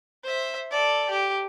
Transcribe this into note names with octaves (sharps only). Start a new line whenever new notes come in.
C5 E5
A4 D5
G4